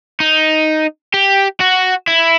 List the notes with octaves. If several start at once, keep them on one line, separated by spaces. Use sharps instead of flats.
D#4
G4
F#4
E4